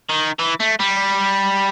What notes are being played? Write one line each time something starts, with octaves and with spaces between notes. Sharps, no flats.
D#3
E3
A3
G3